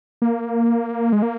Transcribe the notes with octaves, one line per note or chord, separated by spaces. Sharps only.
A#3
G#3
A#3